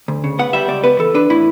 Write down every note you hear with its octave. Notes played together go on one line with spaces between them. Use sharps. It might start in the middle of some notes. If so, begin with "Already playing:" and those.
D2
C#3
B3 F#5
G3 E5
C#2 D5
B3 B4
E3 A4
D4 B4
A2 E4